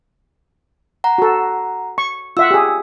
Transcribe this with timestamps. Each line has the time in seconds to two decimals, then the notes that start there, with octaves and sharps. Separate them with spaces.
1.04 F#5 A#5
1.18 F#4 A4
1.98 C#6
2.37 F4 E5 F#5 E6
2.51 G4 G#4